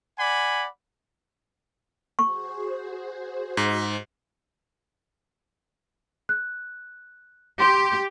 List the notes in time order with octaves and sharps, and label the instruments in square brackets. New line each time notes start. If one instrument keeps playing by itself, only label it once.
[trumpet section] D5 F#5 G#5 B5
[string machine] F#4 G#4 C5 [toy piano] C#6
[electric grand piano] G#2
[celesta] F#6
[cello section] G4 [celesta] C6